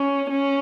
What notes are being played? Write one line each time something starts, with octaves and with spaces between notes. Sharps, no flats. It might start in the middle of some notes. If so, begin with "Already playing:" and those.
Already playing: C#4
C#4